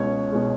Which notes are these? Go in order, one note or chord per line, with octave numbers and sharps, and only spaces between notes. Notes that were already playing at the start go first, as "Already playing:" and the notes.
Already playing: C#2 B2 G#3 C#5
B2 G#3